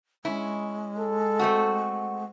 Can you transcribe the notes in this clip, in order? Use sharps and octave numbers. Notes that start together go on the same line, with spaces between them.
G#3 C#4 E4
A4
A3 C4 F#4